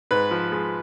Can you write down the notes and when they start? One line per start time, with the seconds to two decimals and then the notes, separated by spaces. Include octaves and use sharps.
0.11 G#2 B4
0.31 F3
0.52 G#3